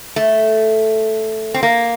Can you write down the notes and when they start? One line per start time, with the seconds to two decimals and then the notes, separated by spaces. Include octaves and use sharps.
0.16 A3
1.54 C4
1.63 A#3